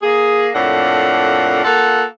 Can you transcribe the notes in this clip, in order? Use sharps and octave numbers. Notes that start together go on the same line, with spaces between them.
A#3 G#4
F2 A2 A#3 D4 F#5
A#3 F4 A4 F#5